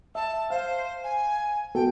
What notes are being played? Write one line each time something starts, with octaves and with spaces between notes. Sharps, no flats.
E5 A5
C5 F5
G#5
B3 F#4 A4 G5